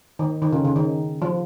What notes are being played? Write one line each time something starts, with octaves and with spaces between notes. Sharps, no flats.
D#3
D#3
C#3
C#3
D#3
F3